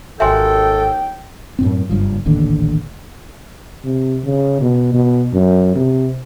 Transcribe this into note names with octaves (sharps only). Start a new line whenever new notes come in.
G#1 D#2 F#4 A4 E5 G5 G#5 C6
F#2 A2 C4
F#1 G2 F3
D#1 A1 D#2 D3
C3
C#3
B2
B2
F#2
C3